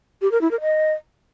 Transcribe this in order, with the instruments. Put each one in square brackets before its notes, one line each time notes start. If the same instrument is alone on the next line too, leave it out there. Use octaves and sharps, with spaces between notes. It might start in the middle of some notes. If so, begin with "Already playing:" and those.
[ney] G4
A#4
E4
A#4
D#5